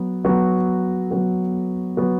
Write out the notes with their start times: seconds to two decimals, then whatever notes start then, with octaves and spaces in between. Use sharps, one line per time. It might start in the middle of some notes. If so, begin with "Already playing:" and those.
Already playing: F#3 B3 F#4
0.24 F#3 B3 F#4
1.11 F#3 B3 F#4
1.97 F#3 B3 F#4